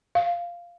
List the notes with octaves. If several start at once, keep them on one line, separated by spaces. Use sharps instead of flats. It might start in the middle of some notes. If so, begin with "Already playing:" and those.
F5